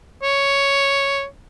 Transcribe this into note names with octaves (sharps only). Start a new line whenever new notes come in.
C#5